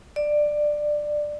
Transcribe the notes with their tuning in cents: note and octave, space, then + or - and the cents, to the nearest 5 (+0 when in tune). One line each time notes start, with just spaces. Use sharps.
D5 +15